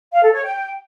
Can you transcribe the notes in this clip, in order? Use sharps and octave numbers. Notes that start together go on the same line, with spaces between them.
F5
A4
C#5
G5